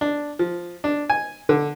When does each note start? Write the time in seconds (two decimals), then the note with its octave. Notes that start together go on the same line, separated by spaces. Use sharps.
0.01 D4
0.39 F3
0.84 D4
1.10 G#5
1.49 D3